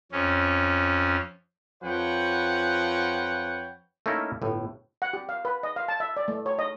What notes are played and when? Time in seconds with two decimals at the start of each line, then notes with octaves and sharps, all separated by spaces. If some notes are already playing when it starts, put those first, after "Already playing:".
0.12 F2 C#4
1.83 F2 F3 B4 C#5 F#5 G5
4.06 A3 A#3 C#4 D#4 E4 A#4
4.42 G1 A2
5.02 F#5
5.13 G4
5.29 F5
5.45 B4
5.63 D#5
5.76 F5
5.88 A5
6.00 E5
6.17 D5
6.28 A3
6.46 C#5
6.59 D#5